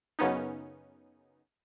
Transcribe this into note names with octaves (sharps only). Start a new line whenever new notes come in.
F#2 C#3 B3 C#4 D#4